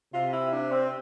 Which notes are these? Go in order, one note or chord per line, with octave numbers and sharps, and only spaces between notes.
C3 F4
E4
D4
C4